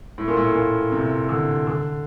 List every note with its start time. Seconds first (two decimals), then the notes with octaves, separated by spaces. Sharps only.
0.18 A2
0.28 A#2
0.37 A2
0.55 A#2
0.92 C3
1.29 D3
1.67 D3